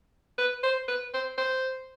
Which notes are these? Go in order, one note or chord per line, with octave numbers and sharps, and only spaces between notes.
B4
C5
B4
C5
C5